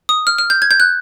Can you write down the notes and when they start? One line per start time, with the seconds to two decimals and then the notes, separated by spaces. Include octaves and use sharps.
0.09 D#6
0.27 F6
0.38 F6
0.50 G6
0.62 G#6
0.71 G6
0.80 F#6